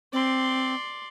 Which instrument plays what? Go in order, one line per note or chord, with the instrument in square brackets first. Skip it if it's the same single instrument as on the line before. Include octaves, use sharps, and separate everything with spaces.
[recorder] C4 [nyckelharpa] D5 C6